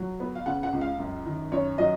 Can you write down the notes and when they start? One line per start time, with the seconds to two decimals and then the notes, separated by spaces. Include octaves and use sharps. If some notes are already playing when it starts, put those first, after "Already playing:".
Already playing: F#3
0.20 B3
0.35 F5
0.46 C#3 F#5
0.63 F#5
0.73 C#2
0.81 F5
0.98 F#2
1.25 D#3
1.52 F#2 C#5
1.78 F#3 D#5